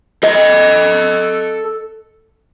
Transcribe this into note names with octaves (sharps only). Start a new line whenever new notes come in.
A4 D#5